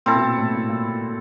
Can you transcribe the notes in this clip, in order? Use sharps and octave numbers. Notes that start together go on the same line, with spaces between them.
A#2 C4 E4 A4
B2
A#2
A2
A#2
A#2